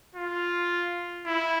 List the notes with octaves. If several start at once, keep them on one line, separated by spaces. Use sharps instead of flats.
F4
E4